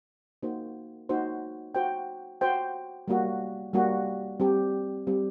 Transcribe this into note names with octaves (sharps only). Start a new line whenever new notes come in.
A#3 D#4 F#4 C5
A#3 D#4 F#4 C5
F#4 C5 G5
F#4 C5 G5
G3 A#3 F#4
G3 A#3 F#4
G3 C4 G4
G3 C4 G4